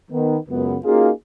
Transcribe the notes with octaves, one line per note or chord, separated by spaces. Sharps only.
D#3 B3
C#2 F#2 B3
A#3 C#4 D#4 F4 F#4 G#4